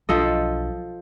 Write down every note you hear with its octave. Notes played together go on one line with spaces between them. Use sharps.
B1 F3 D4 A4 D#5